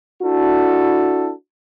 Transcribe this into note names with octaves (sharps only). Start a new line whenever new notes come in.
D4 E4 F#4 A4